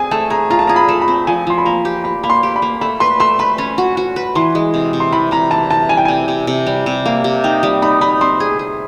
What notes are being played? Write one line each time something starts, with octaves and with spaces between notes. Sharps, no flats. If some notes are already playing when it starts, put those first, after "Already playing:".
Already playing: C4 G#4 G#5
A3 A5
G#4 A#5
F4 A#5
A5
G#4 A#5
B5
A3
B5
C4
F3 G#5
F3 C6
B5
A#3 A#5
G4
G4 B5
A#3 B5
C6
G4
B5
A#3
A3 B5
B4 C6
A3 C6
B4 B5
C#4
F#4
F#4
B4
E3 C6
G#3
C3
C3
C6
E3 B5
C3 A#5
E3 A5
E3 A5
G3 G#5
G5
C3 G#5
C3
C3
G3
C3
A#3
C3
D#4 G5
G3
D#4 B5
D#4 B5
C4 C6
G#4
G#4